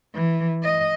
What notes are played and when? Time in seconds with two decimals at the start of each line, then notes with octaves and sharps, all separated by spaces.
0.14 E3
0.64 D#5